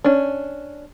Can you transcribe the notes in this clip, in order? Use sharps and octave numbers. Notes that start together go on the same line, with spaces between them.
C#4 D4